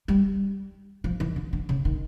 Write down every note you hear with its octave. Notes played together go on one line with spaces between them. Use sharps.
G3
F3
E3
D3
D3
C#3
D#3